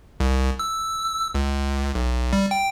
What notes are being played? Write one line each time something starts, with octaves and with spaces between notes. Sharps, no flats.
C2
E6
C#2
B1
G3
G5